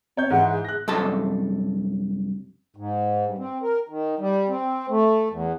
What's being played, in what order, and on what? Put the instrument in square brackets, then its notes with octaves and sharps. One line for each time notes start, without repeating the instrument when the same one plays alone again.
[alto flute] C4 [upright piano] C#5 G6
[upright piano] G#2 E3 G#3 [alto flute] F#5
[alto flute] G#4
[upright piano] F#6 A#6
[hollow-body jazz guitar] C2 F#2 A4 A5
[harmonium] G#2
G2
C4
A#4
D#3
G3
C4
A3
E2